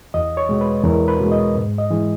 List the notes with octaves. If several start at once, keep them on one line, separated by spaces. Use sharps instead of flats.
E2 D#5
C#5
B2 G#3
B4
E2 A#4
B4
B2 G#3
D#5
G#2
D#5
E3 G#3